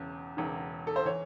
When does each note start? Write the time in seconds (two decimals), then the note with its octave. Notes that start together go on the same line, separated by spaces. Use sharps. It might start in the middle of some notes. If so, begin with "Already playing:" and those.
Already playing: E1 E2 C#3
0.37 E1 E2 C#3
0.87 A4
0.96 C5
1.05 E3 C#5